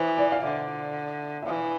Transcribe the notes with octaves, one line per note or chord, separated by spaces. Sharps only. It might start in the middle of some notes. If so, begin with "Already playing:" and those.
Already playing: E3 C5
D5
F5
D3 E5
E5
E3 F5